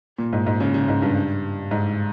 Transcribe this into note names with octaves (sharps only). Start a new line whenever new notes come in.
A#2
G#2
G#2
C#3
C#3
G#2
G2
G#2